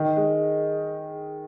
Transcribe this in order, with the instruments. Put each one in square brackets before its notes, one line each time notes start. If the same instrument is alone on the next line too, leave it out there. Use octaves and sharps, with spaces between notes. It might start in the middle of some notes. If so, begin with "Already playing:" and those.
Already playing: [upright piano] D#3
G#3